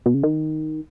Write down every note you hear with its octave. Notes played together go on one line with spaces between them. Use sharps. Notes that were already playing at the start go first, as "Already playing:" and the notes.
B2
C#3
D#3